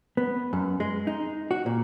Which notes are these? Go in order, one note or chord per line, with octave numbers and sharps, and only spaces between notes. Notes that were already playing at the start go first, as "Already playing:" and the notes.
B3
F#2
G#3
D#4
F#4
A#2